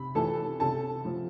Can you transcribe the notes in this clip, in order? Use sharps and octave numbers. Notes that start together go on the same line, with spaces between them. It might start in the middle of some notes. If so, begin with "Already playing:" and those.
Already playing: C3 B5
E3 A4 A5
C3 A4 A5
F3